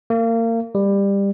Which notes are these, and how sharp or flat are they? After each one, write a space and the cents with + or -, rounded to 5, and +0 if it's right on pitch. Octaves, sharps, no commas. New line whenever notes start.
A#3 -30
G3 +20